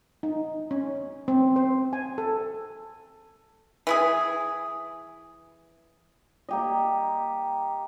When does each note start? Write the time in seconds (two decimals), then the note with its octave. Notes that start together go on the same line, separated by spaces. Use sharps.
0.23 D#4
0.71 C#4
1.28 C4
1.56 C5
1.93 G#5
2.18 A4
3.87 E3 E4 G#4
6.49 A#3 G4 D#5